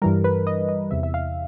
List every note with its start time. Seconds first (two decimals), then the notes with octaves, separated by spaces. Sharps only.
0.02 G2 E3 G3 A#4
0.24 B4
0.47 D#5
0.69 D#5
0.91 E2 C3 E3 E5
1.03 E5
1.14 F5